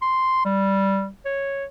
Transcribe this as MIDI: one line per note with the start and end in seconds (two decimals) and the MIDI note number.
0.02 0.44 84
0.45 1.08 55
1.25 1.65 73